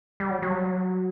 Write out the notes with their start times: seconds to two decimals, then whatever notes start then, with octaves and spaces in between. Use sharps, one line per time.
0.20 G3
0.30 F#3
0.42 F#3